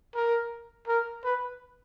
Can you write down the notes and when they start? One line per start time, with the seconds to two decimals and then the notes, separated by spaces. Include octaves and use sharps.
0.15 A#4
0.88 A#4
1.24 B4